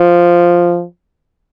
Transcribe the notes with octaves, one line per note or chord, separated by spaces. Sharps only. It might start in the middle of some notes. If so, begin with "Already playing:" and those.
Already playing: F3